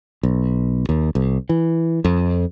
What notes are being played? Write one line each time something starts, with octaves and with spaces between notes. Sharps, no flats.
B1
D#2
C2
E3
F2